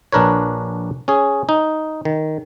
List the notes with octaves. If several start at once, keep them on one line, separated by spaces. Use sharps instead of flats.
A#1 D4 A#4 B4 C#5
C#4 G#4
D#4
D#3